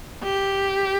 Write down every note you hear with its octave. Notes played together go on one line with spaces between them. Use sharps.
G4